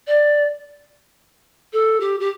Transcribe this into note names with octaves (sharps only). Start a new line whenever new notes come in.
D5
A4
G4
G4